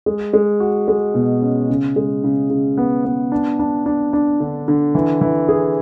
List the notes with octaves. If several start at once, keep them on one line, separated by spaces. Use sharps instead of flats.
G#3
G#3
F#4
G#3
B2
C#4
C#3
G#3
C#3
C#3
B3
B3
D4
D4
D4
D4
D3
D3
E3
E3
G#4